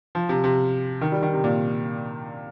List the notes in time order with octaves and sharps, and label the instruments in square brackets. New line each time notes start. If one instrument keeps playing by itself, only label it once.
[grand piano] F3
C3
C3
D#3
G3
D#3
C3
A#2